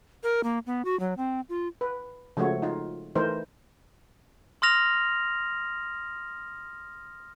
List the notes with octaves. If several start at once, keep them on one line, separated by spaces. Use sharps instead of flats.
A#4
A#3
B3
F#4
F#3
C4
F4
B4
C#3 F3 G#3 A3 F#4 C#5
D#4 F4
E3 A3 D#4 A#4 C5
C6 D#6 F6 A#6 F7